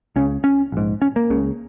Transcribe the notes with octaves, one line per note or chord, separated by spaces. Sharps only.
C#2 C#3 C#4
C#4
A#1 G#2
C#4
A#3
C#2 C#3